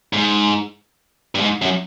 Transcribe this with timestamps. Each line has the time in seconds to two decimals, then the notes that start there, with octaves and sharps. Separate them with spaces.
0.13 G#2
1.35 G2
1.41 G#2
1.62 F#2